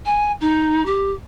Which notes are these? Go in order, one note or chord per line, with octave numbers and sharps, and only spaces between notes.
G#5
D#4
G4